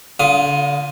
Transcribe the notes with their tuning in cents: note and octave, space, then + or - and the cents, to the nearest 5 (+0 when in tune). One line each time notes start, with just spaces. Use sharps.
D3 -35 F4 +0 D#6 +5